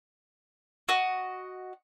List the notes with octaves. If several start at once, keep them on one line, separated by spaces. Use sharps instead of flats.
F#4 D#5